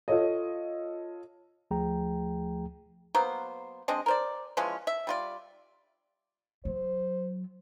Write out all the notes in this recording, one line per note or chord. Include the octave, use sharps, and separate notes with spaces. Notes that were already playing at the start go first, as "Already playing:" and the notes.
F4 A4 C#5 D#5
D2 F3 A3 G#4 G5 A#5
F#3 A#3 B3 C5
G#3 C4 D4 D#5
A#4 C5 D5
E3 F3 G#3 C#4
E5
G3 F4 D5
F#3 C5